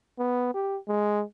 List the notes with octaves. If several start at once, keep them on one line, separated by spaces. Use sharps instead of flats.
B3
G4
G#3